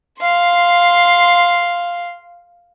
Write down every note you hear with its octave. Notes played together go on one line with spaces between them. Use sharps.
F5 C6